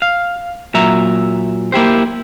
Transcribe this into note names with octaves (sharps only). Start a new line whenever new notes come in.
F5
A#2 F#3 E5 A#5
A#3 E4 G4 C5